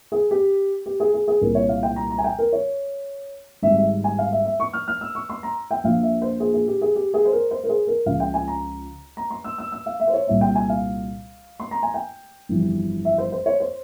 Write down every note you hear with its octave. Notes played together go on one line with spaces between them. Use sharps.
G#4
G4
G4
G#4
G#4
G#4
C2 A#2 G3 A#4
C#5
F5
G5
A#5
A#5
G#5
G5
A#4
C#5
G#1 G#2 G3 E5
E5
G#5
F5
E5
E5
C#6
F6
F6
E6
C#6
C6
A#5
G5
A#1 A#2 F3 F5
E5
C5
G#4
G#4
G4
G#4
G4
G#4
C5
A#4
C5
A#4
G#4
A#4
C#2 C#3 F3 F5
G5
G#5
A#5
A#5
C6
E6
E6
E6
F5
E5
C5
C#5
C2 A#2 G3 E5
G5
G#5
F5
C6
A#5
G#5
G5
G1 F2 E3 G3
E5
C5
C5
C#5
C5